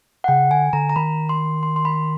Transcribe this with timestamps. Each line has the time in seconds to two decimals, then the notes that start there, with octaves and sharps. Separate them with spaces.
0.24 F#5
0.28 C#3 G5
0.51 D3 G#5
0.73 D3 A#5
0.89 A#5
0.96 D#3 B5
1.29 C6
1.63 C6
1.76 C6
1.85 B5